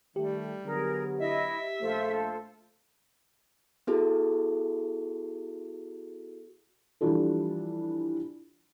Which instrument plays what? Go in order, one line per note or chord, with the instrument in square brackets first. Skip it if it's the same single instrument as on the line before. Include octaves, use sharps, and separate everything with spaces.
[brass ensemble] D#3 A3 [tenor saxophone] G3 [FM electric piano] G4
[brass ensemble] D3 F#3 B3 [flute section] G#4 A#4
[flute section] E4 D#5 [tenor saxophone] E5
[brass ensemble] A#1 A3 [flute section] F4 A4 C5
[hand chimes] B3 E4 F#4 G#4 A4
[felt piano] E3 F3 G3 D4 F4 A4